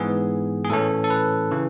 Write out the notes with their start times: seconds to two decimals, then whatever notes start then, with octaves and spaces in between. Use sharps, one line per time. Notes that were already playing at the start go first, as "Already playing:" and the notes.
Already playing: G#2 E3 B3 G#4
0.65 G#4
0.70 A2 E3 A3 C#4 A4
1.04 A4
1.10 B4
1.51 C#3 E3